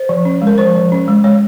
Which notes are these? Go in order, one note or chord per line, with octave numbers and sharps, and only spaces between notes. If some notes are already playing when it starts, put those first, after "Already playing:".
Already playing: C5
F3
C#4
G#3
A#4
F3 C5
F3
C#4
G#3
G#3 C#5